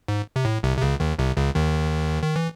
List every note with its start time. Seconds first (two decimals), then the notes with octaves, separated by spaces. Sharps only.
0.08 G#2
0.36 C3
0.45 A2
0.63 C2 C3
0.78 C3
0.82 C#2 C#3
1.00 D#2 D#3
1.19 C2 C3
1.37 C#2 C#3
1.55 D#2 D#3
2.23 D#3
2.36 E3